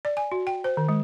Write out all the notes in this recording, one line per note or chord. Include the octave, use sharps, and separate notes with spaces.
D5
G#5
F#4
G5
C5
D#3
G#3